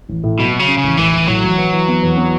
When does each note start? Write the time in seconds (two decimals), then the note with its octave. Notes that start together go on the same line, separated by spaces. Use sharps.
0.09 A1
0.24 A2
0.39 B2 F#3
0.53 F#3
0.59 C#3
0.68 C#4
0.78 C#3
0.84 A1
0.98 A1 E3
1.13 A1
1.28 A2 F#3
1.43 A1
1.58 E3
1.73 E3
1.88 B3
2.03 E2
2.17 B3